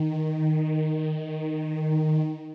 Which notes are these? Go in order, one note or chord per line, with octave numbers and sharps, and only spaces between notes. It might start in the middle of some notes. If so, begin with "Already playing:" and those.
Already playing: D#3